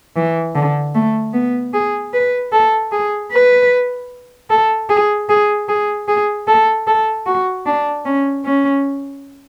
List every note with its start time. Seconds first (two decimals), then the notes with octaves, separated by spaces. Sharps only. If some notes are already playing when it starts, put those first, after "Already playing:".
0.16 E3
0.55 D3
0.95 A3
1.34 B3
1.74 G#4
2.14 B4
2.53 A4
2.92 G#4
3.32 B4
4.50 A4
4.90 G#4
5.29 G#4
5.69 G#4
6.08 G#4
6.48 A4
6.87 A4
7.27 F#4
7.66 D4
8.05 C#4
8.45 C#4